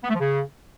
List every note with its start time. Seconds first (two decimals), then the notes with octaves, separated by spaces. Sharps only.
0.04 B3
0.09 A3
0.14 F3
0.19 C#3